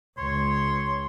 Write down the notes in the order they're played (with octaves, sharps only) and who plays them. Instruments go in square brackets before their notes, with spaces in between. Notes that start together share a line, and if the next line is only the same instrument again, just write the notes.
[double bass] C#2 [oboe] C#5 [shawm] C6